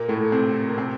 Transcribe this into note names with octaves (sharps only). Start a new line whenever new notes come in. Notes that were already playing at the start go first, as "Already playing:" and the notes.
Already playing: A#2 A#3
A2 A3
C3 C4
A#3
C3 C4